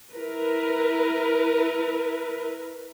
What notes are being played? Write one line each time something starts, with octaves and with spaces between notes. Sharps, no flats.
E4 A#4 B4